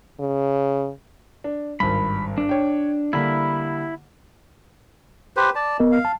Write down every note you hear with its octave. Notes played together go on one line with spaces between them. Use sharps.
C#3
D4
G#1 G2 B5
D4
C#5 G5
D3 G3 A#3 E4 B5
G4 B4 C5
D5 A5
B3 A#4 D#5
F5
A5